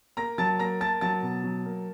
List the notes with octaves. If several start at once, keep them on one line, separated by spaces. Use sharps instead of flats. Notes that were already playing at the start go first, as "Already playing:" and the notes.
A#3 A#5 A#6
F#3 A5 A6
A#3 A#5 A#6
A#3 A5 A6
F#3 A5 A6
B2
F#3
A#3